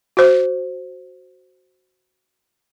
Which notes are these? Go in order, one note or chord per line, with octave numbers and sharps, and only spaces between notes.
F#4 C5